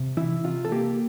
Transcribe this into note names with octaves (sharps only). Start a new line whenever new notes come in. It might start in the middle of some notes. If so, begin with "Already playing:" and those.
Already playing: C3
E3 E4
C3 F4
A4
A#3 G4